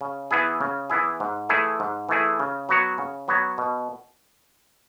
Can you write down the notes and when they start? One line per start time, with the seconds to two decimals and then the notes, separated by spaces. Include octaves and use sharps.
0.01 C#3
0.31 E3 B3 E4 G#4
0.61 C#3
0.90 E3 B3 E4 G#4
1.20 G#2
1.49 E3 A3 E4 G#4
1.80 G#2
2.09 E3 A3 E4 G#4
2.40 C#3
2.69 F#3 B3 F#4 C#5
2.98 C#3
3.28 F#3 B3 F#4 C#5
3.58 B2